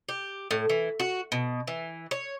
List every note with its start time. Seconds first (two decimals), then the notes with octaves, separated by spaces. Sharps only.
0.09 G4
0.51 A2
0.70 E3
1.00 F#4
1.32 B2
1.67 E3
2.11 C#5